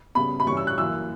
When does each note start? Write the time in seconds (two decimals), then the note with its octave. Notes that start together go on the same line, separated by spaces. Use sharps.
0.15 C#3 G3 B3 B5
0.40 B5
0.47 G2 E3 G3 C#4 C#6
0.57 E6
0.67 F#6
0.78 F#2 E3 A#3 E6